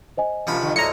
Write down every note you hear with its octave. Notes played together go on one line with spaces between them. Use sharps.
C5 D#5 G#5
F2 C3 F3 A#3 B5
G#2 D3
D2 A2 D#5 A#5 C#7